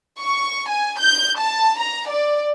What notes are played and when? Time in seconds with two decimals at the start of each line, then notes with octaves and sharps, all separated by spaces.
0.20 C#6
0.69 G#5
0.99 G6
1.39 A5
1.79 A#5
2.09 D5